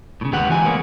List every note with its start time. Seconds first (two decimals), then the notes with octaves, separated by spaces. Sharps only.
0.21 A2 C#3
0.33 D#2 G#3 G4 B4 F#5
0.49 E3 F3 D#4 G#5
0.65 G#3 A#3 B3 C#4